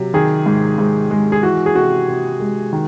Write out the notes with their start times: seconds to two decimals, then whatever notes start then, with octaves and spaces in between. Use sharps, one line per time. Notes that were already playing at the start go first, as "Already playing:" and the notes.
Already playing: C3 F#3
0.14 D#3 G#4
0.46 G#2
0.78 G#2
1.11 G#3
1.32 G#4
1.43 E3 F#4
1.66 G#4
1.75 C3 F#4
2.08 C3
2.40 G#3
2.73 D#3